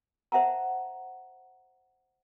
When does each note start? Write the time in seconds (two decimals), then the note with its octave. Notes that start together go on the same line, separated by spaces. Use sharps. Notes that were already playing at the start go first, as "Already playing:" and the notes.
0.32 C5 E5 F#5 A5 A#5